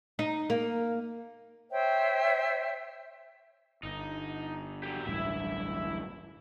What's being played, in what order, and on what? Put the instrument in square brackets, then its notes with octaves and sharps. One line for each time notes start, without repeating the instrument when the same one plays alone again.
[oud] D#4
A#3
[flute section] C5 C#5 E5 G5
[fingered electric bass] G1 [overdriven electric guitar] D#4
[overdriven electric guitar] F#3 G4
[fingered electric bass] D1 A1 G2 [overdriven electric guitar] E4 E5